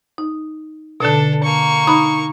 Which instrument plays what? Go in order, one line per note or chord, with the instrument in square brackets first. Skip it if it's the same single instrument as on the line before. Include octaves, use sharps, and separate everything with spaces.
[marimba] D#4
[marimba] B2 D3 [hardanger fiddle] D4 A4
[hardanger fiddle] A#3 C#6
[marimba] D#4 B5